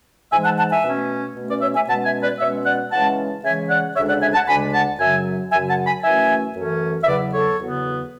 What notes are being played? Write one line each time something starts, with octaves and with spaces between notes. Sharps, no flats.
G#2 E3 G#3 E5 G#5
F#5 A5
F#5 A5
E5 G#5
B2 A3 C#4
B2 A3 C#4
B4 D5
C#5 E5
E5 G#5
B2 G#3 C#4 F#5 A5
E5 G#5
B4 D5
B2 G#3 C#4 C#5 E5
D5 F#5
C#3 E3 G#3 C#4 F#5 A5
C#3 E3 G#3 C#4 E5 G#5
D5 F#5
D2 C#3 G#3 D4 C#5 E5
D5 F#5
E5 G#5
F#5 A5
D2 C#3 G#3 D4 G#5 B5
F#5 A5
F#2 C#3 F#3 E5 G#5
F#2 C#3 F#3 E5 G#5
F#5 A5
G#5 B5
F#2 E3 A3 C#4 E5 G#5
F#2 E3 A3 C#4
E5
E2 C#3 F#3 B3 B4 D5
A4 C#5
E2 C#3 F#3 B3